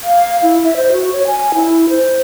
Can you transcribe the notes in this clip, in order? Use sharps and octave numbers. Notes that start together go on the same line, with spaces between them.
F5
E4
E5
C5
F#4
C#5
G#5
E4
C5